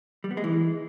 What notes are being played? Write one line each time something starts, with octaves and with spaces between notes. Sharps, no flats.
G3
B3
G#3
E3